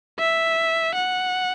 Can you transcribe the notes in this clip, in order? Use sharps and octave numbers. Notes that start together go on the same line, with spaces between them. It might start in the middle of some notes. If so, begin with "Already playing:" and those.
E5
F#5